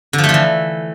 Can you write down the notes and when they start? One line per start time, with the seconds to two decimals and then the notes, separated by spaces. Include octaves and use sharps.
0.13 D3
0.18 F3
0.24 A3
0.29 F3
0.34 E3